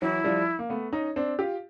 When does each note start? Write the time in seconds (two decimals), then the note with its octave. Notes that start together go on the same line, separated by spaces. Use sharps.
0.02 E3 F#3 E4
0.24 F3 G3
0.59 A#3
0.70 A3 B3
0.93 C#4 D#4
1.16 C4 D4
1.39 F4 G4